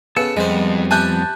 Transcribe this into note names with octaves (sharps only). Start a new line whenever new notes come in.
C#3 B3 A4 E6 C#7
F2 G3 G#3 B3 C5
E4 G4 G#5 A5 F#6 G6